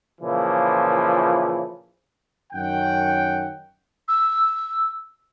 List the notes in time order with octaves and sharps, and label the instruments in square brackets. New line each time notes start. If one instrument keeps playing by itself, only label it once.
[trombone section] A#2 C#3 E3 F3
[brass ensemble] F#2 D#3 C#4 F#5 G5
[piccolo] E6